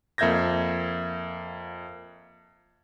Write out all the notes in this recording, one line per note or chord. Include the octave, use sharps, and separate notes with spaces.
F2 A#3 E5 G6 G#6 A#6